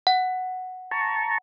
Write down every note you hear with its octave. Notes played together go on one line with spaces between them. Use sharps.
F#5
A5 A#5 C#6